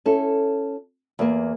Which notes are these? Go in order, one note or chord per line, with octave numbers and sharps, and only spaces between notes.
C#4 E4 A4
E2 A#3